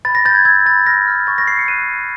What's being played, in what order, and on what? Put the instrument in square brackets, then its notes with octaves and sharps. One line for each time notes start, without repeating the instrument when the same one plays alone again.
[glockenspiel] B5 A6
A#6
G6 A6
G#6
E6 G#6
B5 A6
F6 A#6
F6
C#6 A6
A#6
C#6 C7
C#7
F#6 D#7
C#6